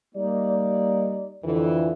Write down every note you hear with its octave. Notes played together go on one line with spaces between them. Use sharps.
G3 A#3 D#4 D5
F2 D3 E3